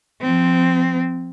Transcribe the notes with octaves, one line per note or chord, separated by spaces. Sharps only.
F3 C4